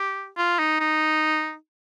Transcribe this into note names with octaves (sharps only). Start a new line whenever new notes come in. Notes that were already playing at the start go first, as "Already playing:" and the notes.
Already playing: G4
F4
D#4
D#4